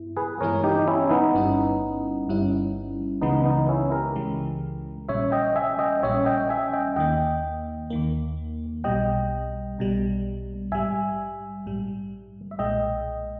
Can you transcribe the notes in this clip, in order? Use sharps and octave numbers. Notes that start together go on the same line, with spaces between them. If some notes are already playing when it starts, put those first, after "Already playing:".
Already playing: G2 B3 E4
G#4 B4
G2 E3 G#3 B3 E4 A#4 C#5
D#4 G4
D#4
C#4 E4
B3 D#4
G1 G2 G3 C#4 E4
G1 G2 G3 C#4 E4
C#2 C#3 E3 G#3 B3 D#4
B3 D#4
C#4 E4
G4 A#4
C#2 C#3 E3 G#3
A#1 A#2 G3 C#4 C#5 E5
D#5 G5
E5 G#5
D#5 G5
A#1 A#2 G3 C#4 C#5 E5
D#5 G5
E5 G#5
D#5 G5
D#2 D#3 A#3 D#5 G5
D#2 D#3 A#3
B1 B2 G3 D#5 G5
B1 B2 G3
A#1 G#2 G3 E5 G#5
A#1 G#2 G3
E5
B1 A#2 G#3 D#5 G5